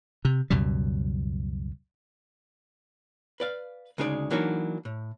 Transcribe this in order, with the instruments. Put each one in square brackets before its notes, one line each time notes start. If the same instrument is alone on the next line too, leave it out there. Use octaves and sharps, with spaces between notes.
[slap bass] C3
C#2 F#2 B2 G3
[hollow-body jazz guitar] B4 D5 F5
D2 C#3 G#3 D#4 G#4 D5
E3 F#3 A#3 D4 D#4 F#4
A2